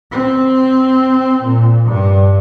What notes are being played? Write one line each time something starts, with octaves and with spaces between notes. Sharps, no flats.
C4
A#2
G2